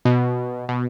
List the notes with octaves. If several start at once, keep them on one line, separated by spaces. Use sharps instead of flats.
B2
B2